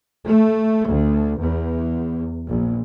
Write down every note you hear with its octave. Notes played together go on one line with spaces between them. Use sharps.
A3
D2
E2
A#1